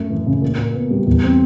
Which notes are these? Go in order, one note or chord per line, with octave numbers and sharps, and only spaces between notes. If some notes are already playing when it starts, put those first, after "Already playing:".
Already playing: F#2 A3
E3
C#3
A#2
A#2
B3
G3
E2
C4